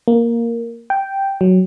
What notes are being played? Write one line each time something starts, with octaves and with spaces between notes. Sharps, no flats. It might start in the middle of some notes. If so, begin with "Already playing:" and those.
A#3
G5
F#3